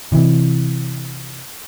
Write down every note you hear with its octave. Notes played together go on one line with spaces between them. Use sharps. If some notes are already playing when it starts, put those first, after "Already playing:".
C3 E3